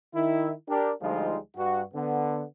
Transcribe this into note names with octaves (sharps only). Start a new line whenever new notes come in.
D#3 E4
D4 G4 A#4
D2 F3 G3 G#3 D#4 F4
G2 F#4
D3 B3